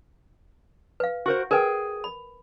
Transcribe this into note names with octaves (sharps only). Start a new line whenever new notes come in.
B4 F5
F#4 A#4 C5
G#4 A#4 B4 G5
B5